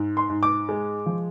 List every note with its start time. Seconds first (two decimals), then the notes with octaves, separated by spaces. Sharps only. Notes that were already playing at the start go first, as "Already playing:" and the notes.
Already playing: G#2
0.17 C6
0.30 G#2
0.43 D6
0.69 G#3
1.06 F3